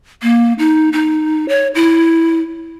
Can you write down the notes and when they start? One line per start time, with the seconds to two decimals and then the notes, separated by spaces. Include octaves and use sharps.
0.23 A#3
0.59 D#4
0.93 D#4
1.49 C#5
1.75 E4